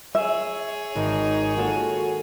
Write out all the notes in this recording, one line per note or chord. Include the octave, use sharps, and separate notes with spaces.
G#4 C#5 E5
G#1 D#4
A#3 F4 F#4 A4